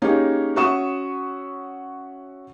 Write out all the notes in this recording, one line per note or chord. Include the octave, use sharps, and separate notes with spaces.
A#3 C#4 D#4 G4 G#4
C#4 F#4 E5 C#6 D#6 E7